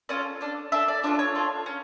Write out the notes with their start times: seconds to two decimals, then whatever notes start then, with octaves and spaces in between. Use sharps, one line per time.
0.09 C#4 F4 A4 D5
0.41 D4 A4
0.72 D4 A4 E5
0.88 D5
1.03 D4 F4 A4 D5
1.19 C#5
1.35 D4 F4 A4
1.66 C#4